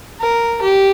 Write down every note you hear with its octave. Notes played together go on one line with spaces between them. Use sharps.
A#4
G4